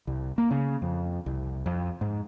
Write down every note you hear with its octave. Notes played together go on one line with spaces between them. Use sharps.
C2
A#3
C#3
F2
C2
F2
G#2